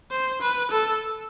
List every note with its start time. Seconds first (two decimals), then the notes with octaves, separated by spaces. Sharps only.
0.11 C5
0.41 B4
0.71 A4